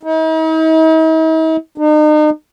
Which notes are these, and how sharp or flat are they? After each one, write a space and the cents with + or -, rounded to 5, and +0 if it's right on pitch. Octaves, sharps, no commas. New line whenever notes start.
D#4 +45
D#4 -40